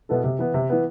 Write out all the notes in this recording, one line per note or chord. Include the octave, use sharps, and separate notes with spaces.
B2 B3 E4 A4
C3
E3 B3
C3
E3 B3